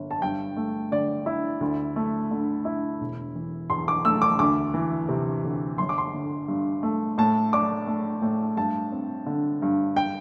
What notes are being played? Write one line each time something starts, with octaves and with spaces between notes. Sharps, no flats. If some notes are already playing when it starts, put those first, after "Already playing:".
Already playing: G1
A5
G2 G5
A3
D3 D5
E4
D2
A3
D3
E4
E1
E3
E2 C6
D6
A3 E6
D6
D2 D6
E3
C3
D2
G1 C6
D6
C6
D3
G2
A3
A2 A5
D4 D6
A3
A2
G2 A5
C4
D3
G2
G5